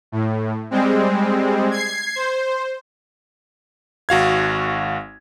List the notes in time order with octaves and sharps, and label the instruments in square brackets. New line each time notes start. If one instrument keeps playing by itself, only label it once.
[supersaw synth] A2
G3 G#3 C4
G#6 C7
C5
[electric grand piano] G#1 F#4 F5 G#6